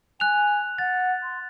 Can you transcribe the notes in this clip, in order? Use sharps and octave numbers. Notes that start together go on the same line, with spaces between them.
G#5 F#6 F7
F#5 A6
C6